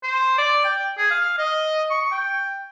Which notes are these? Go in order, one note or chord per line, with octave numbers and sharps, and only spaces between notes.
C5
D5
G5
G#4
F5
D#5
C#6
G5